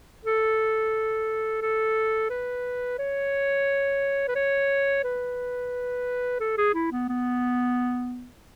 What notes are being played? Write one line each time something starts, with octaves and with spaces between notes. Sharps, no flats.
A4
A4
B4
C#5
B4
C#5
B4
A4
G#4
E4
B3
B3